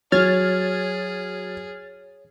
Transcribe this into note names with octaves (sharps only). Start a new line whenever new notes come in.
F#3 G#4 C#5 F6 G#6 A6